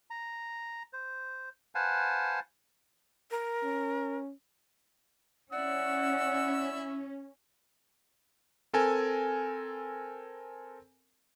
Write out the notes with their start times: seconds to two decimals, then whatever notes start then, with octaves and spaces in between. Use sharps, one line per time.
0.10 A#5
0.93 C5
1.75 B4 C5 F5 F#5 G#5 A5
3.31 A#4
3.64 C#4
5.52 C#4 E4 D5 F#5 E6
8.73 C4 A4 A#4 G#5